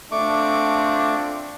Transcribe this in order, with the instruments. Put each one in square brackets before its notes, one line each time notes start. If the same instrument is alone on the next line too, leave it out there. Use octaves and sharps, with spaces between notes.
[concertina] A3 C#6 D6 [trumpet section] C4 D4 F4